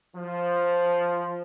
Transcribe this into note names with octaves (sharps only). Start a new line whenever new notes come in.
F3